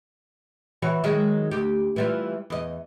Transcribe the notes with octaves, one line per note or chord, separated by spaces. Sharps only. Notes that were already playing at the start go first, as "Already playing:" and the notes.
E3 F#4 C#5
D#3 F#3 G#3
D2 G4
E3 G3 F4
E2 D#5